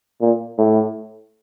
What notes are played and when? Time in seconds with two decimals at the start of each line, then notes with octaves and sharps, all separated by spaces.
0.21 A#2
0.58 A2